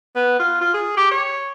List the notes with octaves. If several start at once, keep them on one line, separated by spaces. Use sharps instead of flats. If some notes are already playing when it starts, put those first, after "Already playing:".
B3
F4
F4
G#4
G4
C#5